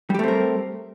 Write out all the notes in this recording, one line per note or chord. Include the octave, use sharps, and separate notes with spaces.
G3 A3 C4 G4 A#4